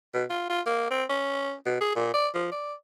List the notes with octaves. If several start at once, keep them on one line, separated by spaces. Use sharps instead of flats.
B2
F4
F4
A#3
C4
C#4
B2
G#4
A#2
D5
F3
D5